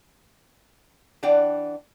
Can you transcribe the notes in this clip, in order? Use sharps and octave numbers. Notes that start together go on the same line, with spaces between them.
E3 D4 D5 F#5 G5